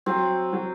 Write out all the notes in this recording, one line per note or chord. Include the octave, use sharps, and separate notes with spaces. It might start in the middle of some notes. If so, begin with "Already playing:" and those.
F#3 C4
F#3